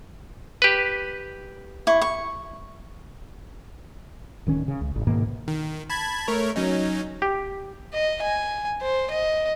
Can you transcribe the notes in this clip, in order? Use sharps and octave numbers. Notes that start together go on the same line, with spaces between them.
G4 B4
E4 C#6
C#6
D1 D#3 C#4
C#3
C#2
G#1
G#2 B2 D#3 A#3
D#3
A5 B5 G#6
A3 A#4 C#5
F#3 C#4 D#4
G4
D#5
G#5
C5
D#5